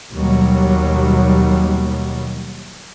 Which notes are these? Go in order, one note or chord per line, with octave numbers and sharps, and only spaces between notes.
D#2 B2 F#3 G3